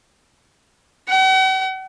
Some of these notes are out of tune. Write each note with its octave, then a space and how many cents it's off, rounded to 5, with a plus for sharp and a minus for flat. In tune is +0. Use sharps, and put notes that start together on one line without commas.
F#5 +45